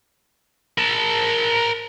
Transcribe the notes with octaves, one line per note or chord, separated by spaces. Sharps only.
A#4 A5